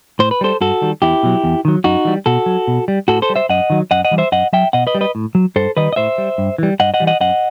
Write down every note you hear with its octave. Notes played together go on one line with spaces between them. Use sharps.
A2 C5
B4
G3 A4 C5
G2 F#4 A4
D#3 G3
E2 E4 G4
B2 F#3
E2
D#3 F#3
F#2 D#4 F#4
E3 G3
B2 F#4 A4
F#3
B2
G3
A2 F#4 A4
A4 C5
G3
C5 E5
F#2 D#5 F#5
D#3 F#3
F#2 D#5 F#5
D#5 F#5
E3 G3
C5 E5
F#2 D#5 F#5
F#3 E5 G5
B2 D#5 F#5
B4 D#5
G3
B4 D#5
A2
F#3
G2 A4 C5
D#3 G3 B4 D#5
D#5
A2 C5 E5
G3
G2
E3 G3
G2 D#5 F#5
D#5 F#5
E3 G3
D#5 F#5
F#2 D#5 F#5